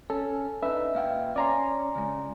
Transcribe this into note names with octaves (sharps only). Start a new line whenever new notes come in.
C#4 A4
D4 D#4 B4 E5
A#2 F5 G5
C#4 C#5 D5 G#5 A#5 C6
C#3 G#3